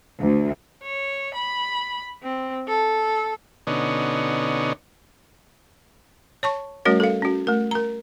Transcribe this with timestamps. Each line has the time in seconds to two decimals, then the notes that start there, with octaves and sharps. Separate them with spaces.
0.20 D2
0.83 C#5
1.34 B5
2.23 C4
2.68 A4
3.67 B2 D3 C#4 D#4
6.43 C#5 A5 C#6
6.85 G3 A3 C#4 F#4 A#4 C#5
7.00 A4 F5
7.22 C#4 F#4
7.47 A3 A#4
7.71 A#4 A#5